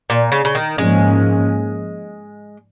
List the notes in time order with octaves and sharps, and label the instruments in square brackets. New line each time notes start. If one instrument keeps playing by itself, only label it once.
[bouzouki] A#2
C#3
C#3
D#3
[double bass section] G#2 F3 A#3 C#4 [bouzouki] G#3